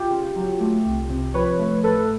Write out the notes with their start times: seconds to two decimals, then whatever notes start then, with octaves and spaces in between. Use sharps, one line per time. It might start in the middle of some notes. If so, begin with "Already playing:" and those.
Already playing: F4 G4
0.11 C#3
0.36 F#3
0.60 A3
0.86 C2
1.10 C3
1.34 F3 B4 C#5
1.59 A3
1.84 A1 A4 B4